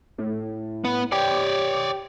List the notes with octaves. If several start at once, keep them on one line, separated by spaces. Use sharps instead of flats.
A2
B3
G4 C#5 D5